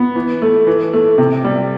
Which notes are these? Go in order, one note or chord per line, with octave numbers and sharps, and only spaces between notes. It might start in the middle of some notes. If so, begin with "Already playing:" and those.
Already playing: B3
E3
A3
E3
A3
C3
G3